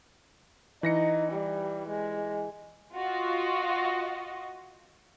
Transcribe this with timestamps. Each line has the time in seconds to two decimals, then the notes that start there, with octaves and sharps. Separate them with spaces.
0.83 E3 D#4 A#6 C#7
1.32 G3
1.88 G#3
2.95 F4 F#4 D#5